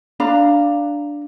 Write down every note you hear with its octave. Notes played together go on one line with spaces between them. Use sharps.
D4 F5 A#5